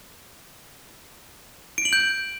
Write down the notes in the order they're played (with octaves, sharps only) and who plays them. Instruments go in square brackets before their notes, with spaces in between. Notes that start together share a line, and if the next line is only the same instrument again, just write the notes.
[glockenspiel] D7
F#7
G6